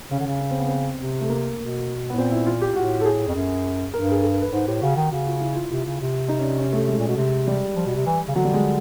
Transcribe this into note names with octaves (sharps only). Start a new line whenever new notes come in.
C#3 C#4
D3
C#3
C#4
C4
B3
C4
C3
A3
A#3
B2
B3
A2
A#2 C4
E4
F4
G4
A2 F#4
A4
G#4
F2
F#2
G2 A#4
G#4
A4
A#4
B4
G#2 C5
A2 G4
C#3 F#4
D#3 F#4
C#3 F#4
F4
E4
F4
C3 F4
C#3
C3
D#4
C#4
D4
C#4
A3
G#3
A#2
B2
C3
G3
F3
B2
C3
E3
C#3
D3 F#3
G3
G#3